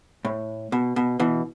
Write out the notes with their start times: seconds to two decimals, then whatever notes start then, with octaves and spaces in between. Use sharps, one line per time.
0.25 A2
0.72 B2
0.96 B2
1.20 B2 E3